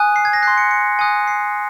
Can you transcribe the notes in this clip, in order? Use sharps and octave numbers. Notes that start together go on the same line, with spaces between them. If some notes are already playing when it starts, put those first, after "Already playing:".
Already playing: G#5 D#6 F#6
C7
G#6
A#6
C6 F#6 C7
C#7
C#7
G#5 D#6 F#6
C7